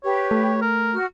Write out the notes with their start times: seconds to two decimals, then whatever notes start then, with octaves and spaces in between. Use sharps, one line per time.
0.04 G4 B4 C#5
0.31 A3
0.62 A#4
0.93 F#4 F6